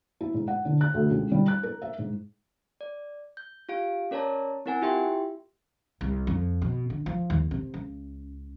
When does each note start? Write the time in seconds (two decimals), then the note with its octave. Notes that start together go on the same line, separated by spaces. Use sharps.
0.21 E4
0.34 G#2
0.48 F#5
0.65 D3
0.81 F#6
0.94 D2
1.11 C#2
1.31 G3
1.48 F#6
1.63 A#4
1.82 E5
1.98 G#2
2.81 D5
3.37 G6
3.69 F4 G4 F5 D7
4.11 C#4 A#4 C#5 D5 A5 A#5
4.66 C4 E4 A#4 F#5 G#5
4.81 E4 F4 G4 E5 G5 C6
6.01 C2
6.27 F2
6.62 B2
6.90 D3
7.06 F3
7.30 D#2
7.51 C3
7.74 C#2